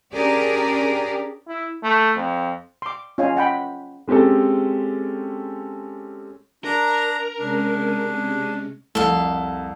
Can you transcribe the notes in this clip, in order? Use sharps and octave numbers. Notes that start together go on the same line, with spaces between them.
C#4 D4 G4 G#4 A#4 D5
E4
A3
F2
C6 D6
C#4 F4 C#5 D#5 F5 G#5
D#5 F#5 G5 B5
G#3 C4 C#4 G4 A4
D4 A#4 A#5
C3 G#3 C#4 D4
C2 F2 A4 F5